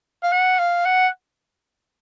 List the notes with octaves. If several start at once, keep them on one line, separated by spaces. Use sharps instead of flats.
F5
F#5
F5
F#5